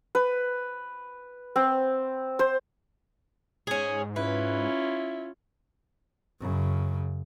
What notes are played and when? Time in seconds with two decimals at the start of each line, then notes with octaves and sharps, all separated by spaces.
0.15 B4
1.56 C4
2.39 C5
3.67 G#2 C#4 G#4
4.16 C#4 E4 F4 B4
6.41 F#2 C#3